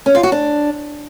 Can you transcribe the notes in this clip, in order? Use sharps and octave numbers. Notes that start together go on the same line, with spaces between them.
C#4
F4
F#4
D4